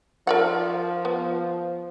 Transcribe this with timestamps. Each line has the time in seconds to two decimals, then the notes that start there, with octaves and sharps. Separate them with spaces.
0.27 F3 A#4 D5 F#5
1.05 B3